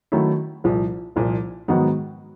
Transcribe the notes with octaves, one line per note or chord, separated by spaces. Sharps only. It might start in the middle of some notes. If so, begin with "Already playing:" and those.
D#3 F#3 A3 C#4 E4
C2 A#2 F3
C2 A#2 F3
G#2 D#3 F#3 B3 D#4